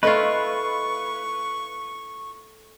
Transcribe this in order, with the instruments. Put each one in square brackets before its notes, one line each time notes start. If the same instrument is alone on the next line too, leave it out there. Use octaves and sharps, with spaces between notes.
[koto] A3 E4 F4 [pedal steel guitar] B4 [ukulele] D#5 [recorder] C#6